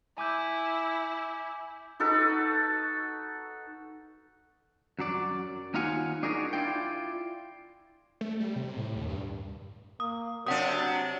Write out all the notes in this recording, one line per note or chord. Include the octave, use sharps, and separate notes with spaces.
E4 G#5 D6 G6
D#4 F#4 A4 B4
F#2 F#3 D5
D#2 D#4 F4 F5 F#5 G#5
D4 D#4 F#4 G#4 A#4 D5
E4 F4 D5 G5
A3
G3
C3
A2
D#2
G2
A#3 D#6
C3 F#3 D4 F#5 D#6